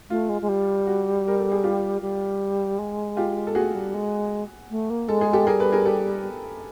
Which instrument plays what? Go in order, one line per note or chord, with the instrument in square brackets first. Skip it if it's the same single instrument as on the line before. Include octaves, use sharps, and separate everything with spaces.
[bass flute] A3 [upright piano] F4
[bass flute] G#3
G#3
G3
[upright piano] F#4
A#4
A4
G#4
F4 G4
[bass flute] G3
G#3
[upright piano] F4 G4
A4
[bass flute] A3 [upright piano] F#4 G#4
[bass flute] G3
G#3
A3
A#3
[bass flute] G#3 [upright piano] A4
[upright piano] G#4
G4 A4
[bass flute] G3 [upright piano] G#4 A#4
[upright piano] A4 B4
G#4 A#4
G4 A4